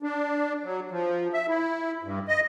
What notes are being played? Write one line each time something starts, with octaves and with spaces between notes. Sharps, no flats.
D4
F#3
F3
E5
E4
G2
D#5